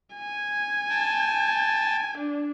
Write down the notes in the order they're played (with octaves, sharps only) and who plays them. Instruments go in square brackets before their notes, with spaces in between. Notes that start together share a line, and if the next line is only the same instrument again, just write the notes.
[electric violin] G#5
[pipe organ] G5 A5
[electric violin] D4